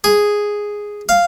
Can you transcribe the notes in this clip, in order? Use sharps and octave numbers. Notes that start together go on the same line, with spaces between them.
G#4
F5